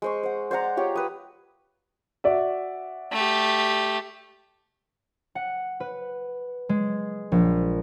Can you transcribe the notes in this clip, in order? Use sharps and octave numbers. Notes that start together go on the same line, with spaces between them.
G#3 C5 C#6
C5 F#5
C5 D5 F#5 A#5
F4 G4 C#5 G5
B4 D#6
F#4 D5 E5
A3 G4
F#5
B4
G#3
A#1